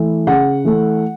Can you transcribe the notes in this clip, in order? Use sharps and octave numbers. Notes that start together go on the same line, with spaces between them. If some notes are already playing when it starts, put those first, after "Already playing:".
Already playing: E3 A3
C#3 F#5
E3 A3